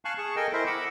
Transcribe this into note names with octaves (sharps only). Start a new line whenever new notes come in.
F5 G#5 A5 C#6 F#6
G#4 A5 C#6
A4 A#4 D#5 G5 G#5
E4 A#4 C5 D#5 E5
F#5 B5 D6 E6